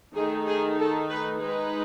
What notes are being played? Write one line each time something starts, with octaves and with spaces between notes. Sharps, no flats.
D#3 A3 D#4 G#4
G#4
A4
B4
G#3 D#4 B4